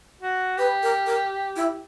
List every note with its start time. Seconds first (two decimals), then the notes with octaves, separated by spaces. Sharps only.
0.21 F#4
0.57 G4 B4
0.83 A#4
1.07 A#4
1.56 E4